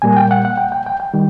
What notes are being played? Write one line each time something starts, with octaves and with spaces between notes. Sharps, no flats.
A#2 G3 A#3 G#5
G5
F#5
F#5
G5
G5
G5
G5
D#3 G3